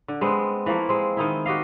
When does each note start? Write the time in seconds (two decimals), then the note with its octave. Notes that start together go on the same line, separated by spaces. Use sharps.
0.08 D3
0.21 G#3 B3 C4
0.66 E3 F3 A3 A#3
0.89 G#3 C4
1.17 D#3 D#4 E4
1.46 F#4 G4 D#5 F5